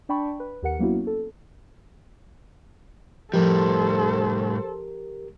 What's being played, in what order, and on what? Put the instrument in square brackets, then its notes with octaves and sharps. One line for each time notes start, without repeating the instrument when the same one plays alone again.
[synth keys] D4 D5 G5 A5 B5 C#6
B4
D#2 G4 A#4 F#5 C#7
F#3 A#3 B3 C#4 E4 F#4
A4
[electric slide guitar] A2 G3 [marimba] F3 [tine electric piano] G4 A#4 [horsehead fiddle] A4 C5